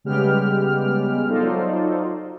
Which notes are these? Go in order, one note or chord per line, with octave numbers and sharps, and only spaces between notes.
C#3 G3 G#3 B3 G4 F6
F#3 D#4 F4 A4 C5 D5